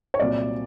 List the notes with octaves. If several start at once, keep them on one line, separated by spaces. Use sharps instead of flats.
C#5
C2 A#2 F#3 D5